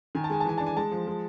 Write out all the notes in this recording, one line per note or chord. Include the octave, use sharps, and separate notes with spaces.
D#3 G#5
A5
G#3 G#5
A5
E3 G#5
D4 A5
G#5
G#3 A5
F3
G#3